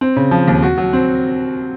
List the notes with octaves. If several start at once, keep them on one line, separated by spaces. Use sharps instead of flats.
C4
C#3
F3
D#2
F#4
F#3
C4